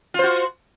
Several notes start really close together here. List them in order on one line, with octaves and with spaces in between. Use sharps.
F4 C5 F#4